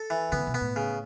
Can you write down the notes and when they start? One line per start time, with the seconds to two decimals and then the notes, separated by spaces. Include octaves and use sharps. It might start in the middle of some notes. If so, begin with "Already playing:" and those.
Already playing: A4
0.10 E3
0.32 C#3 B3
0.47 B2
0.54 B3
0.61 A2
0.76 C#3